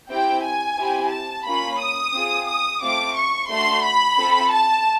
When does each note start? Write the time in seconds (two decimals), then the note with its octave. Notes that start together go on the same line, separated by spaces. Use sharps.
0.10 C4 E4 G4 G5
0.44 G#5
0.77 C4 E4 G4
1.11 A5
1.46 A#3 C#4 F4 B5
1.80 D#6
2.14 C4 F4 G#4
2.48 D#6
2.82 A3 C4 F4 D6
3.16 C#6
3.49 A3 D4 F#4 C6
3.84 B5
4.18 C4 F4 A4
4.52 A5